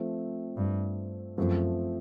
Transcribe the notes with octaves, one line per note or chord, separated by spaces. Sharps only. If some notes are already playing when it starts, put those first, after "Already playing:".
Already playing: F3 A3 C4
G2
F#2 F3 A3 C4